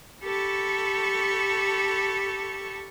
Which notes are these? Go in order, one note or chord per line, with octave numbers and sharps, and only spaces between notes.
G4 A4 A5 B5 C#6